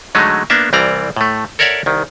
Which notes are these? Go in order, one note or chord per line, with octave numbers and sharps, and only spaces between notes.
D3 F#3 G#3 A3 D#4
A#3 B3 D4 E5
C2 E3 G3 C4 D5 A#5
A2 A3
A4 A#4 C#5 D5 E5 F#5
C2 D#3